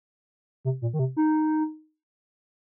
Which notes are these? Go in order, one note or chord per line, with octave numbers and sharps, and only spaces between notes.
C3
A#2
D#3
C3
D#4